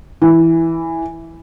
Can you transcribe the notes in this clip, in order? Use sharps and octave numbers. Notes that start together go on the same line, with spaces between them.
E3